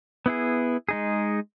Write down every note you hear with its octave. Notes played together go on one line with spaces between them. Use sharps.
B3 E4 G#4
G#3 D#4 G#4